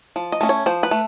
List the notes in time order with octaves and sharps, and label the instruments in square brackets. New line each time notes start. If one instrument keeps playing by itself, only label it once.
[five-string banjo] F3
D#5
A3 C#4
C#5
F3 C5
B4
A3